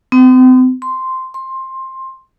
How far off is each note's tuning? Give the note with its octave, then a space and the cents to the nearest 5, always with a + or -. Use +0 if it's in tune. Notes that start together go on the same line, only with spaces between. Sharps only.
C4 -40
C6 -5
C6 +15